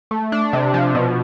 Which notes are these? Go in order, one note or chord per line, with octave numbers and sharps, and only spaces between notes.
A3
D4
C3
F3
B2